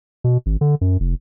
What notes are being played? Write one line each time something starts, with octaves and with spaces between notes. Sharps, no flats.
B2
G#1
D3
F#2
F1